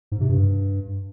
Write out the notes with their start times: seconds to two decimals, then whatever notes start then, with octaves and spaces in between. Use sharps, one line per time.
0.12 G#2
0.20 C3
0.29 G2